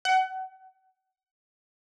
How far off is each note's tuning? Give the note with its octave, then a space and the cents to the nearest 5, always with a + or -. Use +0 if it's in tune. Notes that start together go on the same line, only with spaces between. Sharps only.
F#5 +30